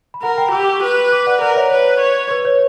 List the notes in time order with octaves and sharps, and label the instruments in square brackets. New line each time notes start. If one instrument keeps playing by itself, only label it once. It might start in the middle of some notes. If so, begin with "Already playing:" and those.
[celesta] B5
[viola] A#4 [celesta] F#5 A#5
[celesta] G5 B5
[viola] G4 [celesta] E6
[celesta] D6
C#6 E6
[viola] B4
[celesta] B5 D6
D5 F#5
[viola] A#4 [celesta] D5 F#5
[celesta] C#5 E5
[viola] B4 [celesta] C#5
[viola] C#5
[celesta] B4
C#5